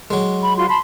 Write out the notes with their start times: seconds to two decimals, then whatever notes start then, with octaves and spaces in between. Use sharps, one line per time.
0.10 F#3 G#3
0.43 B5
0.56 F4 F#4 C6
0.68 A5 B5 C6